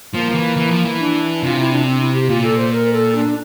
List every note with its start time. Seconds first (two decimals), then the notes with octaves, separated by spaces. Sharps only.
0.14 F3 A#3
0.30 F3
0.35 E3
0.56 E3
0.71 F3
0.85 E3
0.99 D4
1.43 C3 F4
1.59 E4
1.72 D4
1.86 C4
2.01 E4
2.14 G4
2.29 A#2 F4
2.44 A4
2.58 C5
2.73 A#4
2.93 A4
3.15 D4